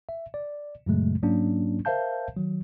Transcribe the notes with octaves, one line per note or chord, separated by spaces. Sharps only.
E5
D5
F#2 A#2 C#3 F#3 G#3 A3
G#2 F#3 A#3 C#4 D4
A#4 C5 E5 F5 A5 G6
D#3 F#3